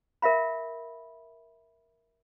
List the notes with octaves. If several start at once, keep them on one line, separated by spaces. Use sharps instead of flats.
A#4 E5 F5 B5